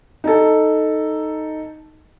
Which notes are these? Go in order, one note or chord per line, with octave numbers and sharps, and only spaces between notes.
D#4 A4